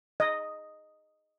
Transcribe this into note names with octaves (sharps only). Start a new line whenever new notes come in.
D#5